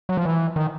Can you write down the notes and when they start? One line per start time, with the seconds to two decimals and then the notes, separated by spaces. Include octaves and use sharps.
0.09 F#3
0.17 F3
0.25 E3
0.56 D#3